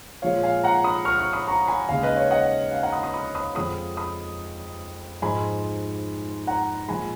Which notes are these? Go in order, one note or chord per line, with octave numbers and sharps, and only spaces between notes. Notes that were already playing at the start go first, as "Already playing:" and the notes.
A#2 F3 G#3 C#5 F5
F5 G#5
F#5 A#5
B5 D#6
C#6 F6
C#6 F6
B5 D#6
A#5 C#6
G#5 B5
D#2 C#3 G#3 F5 G#5
B4 D#5
C#5 F5
D#5 F#5
F5 G#5
F#5 A#5
B5 D#6
B5 D#6
B5 D#6
B5 D#6
F2 F3 G#3 B5 D#6
B5 D#6
G#2 F3 G#3 G#5 B5
F#5 A#5
A#2 F3 G#3 G#5 B5